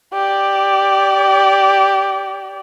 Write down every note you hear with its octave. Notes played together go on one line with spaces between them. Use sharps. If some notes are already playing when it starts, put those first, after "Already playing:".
G4 D5